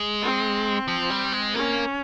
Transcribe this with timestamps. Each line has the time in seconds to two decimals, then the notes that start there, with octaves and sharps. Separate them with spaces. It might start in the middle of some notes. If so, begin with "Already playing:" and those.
Already playing: G#3
0.21 C4
0.88 F3
1.10 G3
1.32 G#3
1.54 A#3 C#4